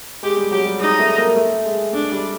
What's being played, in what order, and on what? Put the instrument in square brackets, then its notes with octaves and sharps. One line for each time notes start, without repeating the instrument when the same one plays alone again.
[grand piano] G#3 [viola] G4
[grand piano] G3
[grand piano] F#3 [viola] G4
[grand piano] G3
[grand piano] G#3 [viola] D#4
[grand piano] G#3
A3
A#3
A3
G#3
[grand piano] A3 [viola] D4
[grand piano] G3